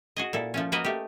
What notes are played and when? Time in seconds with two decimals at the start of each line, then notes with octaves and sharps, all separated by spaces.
0.16 F#4 G#4 D#5
0.33 A#2 E4 A4
0.54 F3 A3 C#4
0.72 A#3 F#4 A#4 B4 D#5
0.85 A3 G4